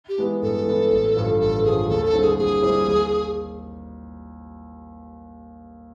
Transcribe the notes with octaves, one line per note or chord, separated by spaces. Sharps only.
G4
E3 G#3 B3 E4
G2 A4
E3 G#3 B3 E4
A1
G2 D3 F3
A1 A4
G2 D3 F3 G#4
D#2 A4
A4
D3 G3 C4 E4
G#4
D#2 G#4
D3 G3 C4 E4
D#2